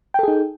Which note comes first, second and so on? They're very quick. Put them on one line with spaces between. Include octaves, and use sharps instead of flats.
G5 A4 G#4 D#4